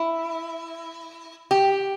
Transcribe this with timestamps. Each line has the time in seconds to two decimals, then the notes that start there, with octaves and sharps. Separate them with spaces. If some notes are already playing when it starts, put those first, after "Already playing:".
Already playing: E4
1.51 G4